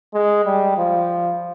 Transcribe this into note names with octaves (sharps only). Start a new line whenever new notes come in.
G#3
G3
F3